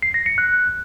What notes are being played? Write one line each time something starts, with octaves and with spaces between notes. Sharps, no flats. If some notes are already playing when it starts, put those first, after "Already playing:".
C7
A#6
C#7
F#6